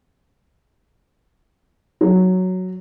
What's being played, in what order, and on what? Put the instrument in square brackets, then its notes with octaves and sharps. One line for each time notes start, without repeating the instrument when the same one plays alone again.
[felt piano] F#3